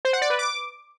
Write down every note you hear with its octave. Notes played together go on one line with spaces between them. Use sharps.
C5
F#5
D5
B4
D6